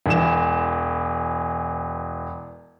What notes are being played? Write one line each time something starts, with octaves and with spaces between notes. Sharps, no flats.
E1 E3 E7